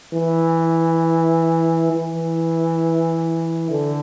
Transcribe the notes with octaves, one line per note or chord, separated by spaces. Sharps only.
E3
E3
D3